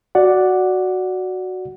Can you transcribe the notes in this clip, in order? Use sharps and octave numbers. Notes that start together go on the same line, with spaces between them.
F#4 D5 F#5